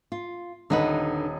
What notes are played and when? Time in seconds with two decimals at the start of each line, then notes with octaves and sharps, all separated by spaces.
0.12 F4
0.70 D#1 D3 D#4 B4 D#5 F#5